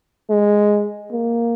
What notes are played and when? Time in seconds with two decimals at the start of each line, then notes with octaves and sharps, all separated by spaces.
0.30 G#3
1.12 A#3